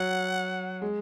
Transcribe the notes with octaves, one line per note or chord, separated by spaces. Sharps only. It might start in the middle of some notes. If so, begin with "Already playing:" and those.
Already playing: F#3 F#5
G#3